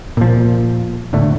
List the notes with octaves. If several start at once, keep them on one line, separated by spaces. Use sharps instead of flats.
A#2 F3
E1 A2 D3 A3